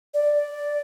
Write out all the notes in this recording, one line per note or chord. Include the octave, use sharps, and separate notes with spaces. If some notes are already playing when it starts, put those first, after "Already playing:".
D5